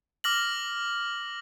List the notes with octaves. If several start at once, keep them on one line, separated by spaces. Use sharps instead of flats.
D6 F6 A#6 F#7